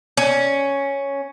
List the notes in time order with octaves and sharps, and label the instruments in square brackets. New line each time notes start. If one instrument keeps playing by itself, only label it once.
[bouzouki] C#4